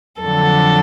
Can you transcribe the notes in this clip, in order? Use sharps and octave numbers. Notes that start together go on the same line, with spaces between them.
F2 D3 F#3 A4